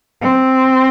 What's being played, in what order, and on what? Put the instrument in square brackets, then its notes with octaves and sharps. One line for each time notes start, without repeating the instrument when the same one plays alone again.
[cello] C4